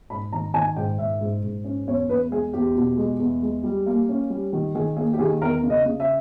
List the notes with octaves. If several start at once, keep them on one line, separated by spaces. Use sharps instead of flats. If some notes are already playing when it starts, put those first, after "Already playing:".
G#2 B5
D#3 A#5
D#3 G#5
G#2 G5
G#2 E5
G#2
G#2
C#4
E2 C#5
E2 B4
G#3 G#4
E2 G4
B2
G#3
E2
G#3
G3
A#3
C#4
G3
D#3
D#3 G#4
A#3 G#4
G4
D#3 G#4
E2 A#4
C#3
D#5
C#3
E5